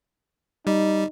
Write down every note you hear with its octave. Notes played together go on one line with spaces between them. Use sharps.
G3 D#4